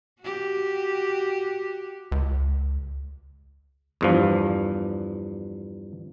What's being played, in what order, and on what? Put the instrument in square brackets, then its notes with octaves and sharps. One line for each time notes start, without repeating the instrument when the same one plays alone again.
[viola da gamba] F#4 G4
[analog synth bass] C#2
[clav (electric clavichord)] E2 G2 F3